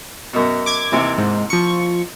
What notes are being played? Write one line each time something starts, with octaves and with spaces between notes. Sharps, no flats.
F#2 B2
D6 G#6
D#2 C3 E3
G#2
F3 C#6